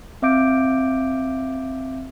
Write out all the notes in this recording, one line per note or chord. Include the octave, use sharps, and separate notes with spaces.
C4 E5 F5 D6 G6 D7